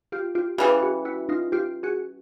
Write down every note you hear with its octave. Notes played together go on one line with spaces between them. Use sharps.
F4 G4
F4 G4
C#3 E3 G3 F#4 G#4
F#4 G#4
E4 F#4
D#4 F4
F4 G4
F#4 G#4